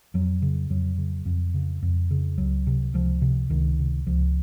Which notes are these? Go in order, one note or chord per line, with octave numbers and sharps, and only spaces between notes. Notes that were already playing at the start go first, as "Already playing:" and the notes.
F2 F#3
C#3
F2 F#3
C#3
F2
C#3
F2
C#3
C#2 F#3
C3
C#2 F3
C3
C#2 D#3
C3
C#2 F3